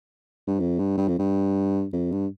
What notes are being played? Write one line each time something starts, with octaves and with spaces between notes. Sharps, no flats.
G2
F2
G2
G2
F2
G2
F2
G2